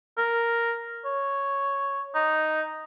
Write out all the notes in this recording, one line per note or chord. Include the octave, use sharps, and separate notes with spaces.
A#4
C#5
D#4